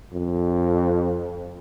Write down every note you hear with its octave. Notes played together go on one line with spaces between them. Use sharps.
F2